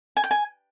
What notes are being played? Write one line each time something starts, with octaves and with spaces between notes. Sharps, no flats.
G#5
G5
G#5